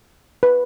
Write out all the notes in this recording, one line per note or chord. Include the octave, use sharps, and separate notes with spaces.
B4